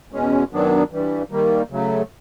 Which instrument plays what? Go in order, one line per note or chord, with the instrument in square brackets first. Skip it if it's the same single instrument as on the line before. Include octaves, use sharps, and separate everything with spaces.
[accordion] E2 B2 G#3 C#4
F#2 D#3 F#3 B3 D4
G2 E3 G3
D#3 G3 A#3
C#3 F#3 A3